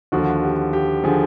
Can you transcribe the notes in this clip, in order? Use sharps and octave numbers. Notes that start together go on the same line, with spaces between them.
D#2 D3 F3 F#4
G4
G4
D3 F3 G#4